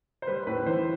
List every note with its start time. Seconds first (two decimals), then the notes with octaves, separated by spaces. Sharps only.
0.22 C5
0.27 G3 B4
0.47 A2 B4
0.66 E3 C5